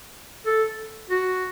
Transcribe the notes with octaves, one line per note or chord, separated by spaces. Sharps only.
A4
F#4